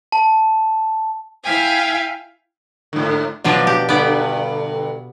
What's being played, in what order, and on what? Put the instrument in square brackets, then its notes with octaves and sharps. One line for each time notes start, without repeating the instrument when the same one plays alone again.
[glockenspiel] A5
[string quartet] E4 E5 F5 G5 G#5
[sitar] G#2 D3
[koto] B2 F3 F#3 [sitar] D4
[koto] G4
[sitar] G2 D3 [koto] B3 D5